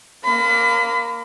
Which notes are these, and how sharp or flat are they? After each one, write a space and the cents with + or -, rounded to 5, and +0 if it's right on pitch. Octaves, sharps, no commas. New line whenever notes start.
A#3 +0 B5 +35